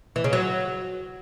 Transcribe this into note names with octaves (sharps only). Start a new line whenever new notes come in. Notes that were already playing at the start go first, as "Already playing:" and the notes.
E3
C#3
F#3